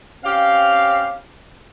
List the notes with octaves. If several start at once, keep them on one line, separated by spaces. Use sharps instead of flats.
C4 C#4 G4 F5